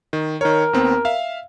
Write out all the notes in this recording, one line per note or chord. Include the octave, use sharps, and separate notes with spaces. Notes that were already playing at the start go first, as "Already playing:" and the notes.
D#3
D#3 A#4 C#5
D#2 B3 C4
E5 F5